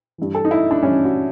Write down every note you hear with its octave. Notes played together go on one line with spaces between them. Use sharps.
G2 E3
A4
D#4
E4
D4
G2 E3 C#4
F#4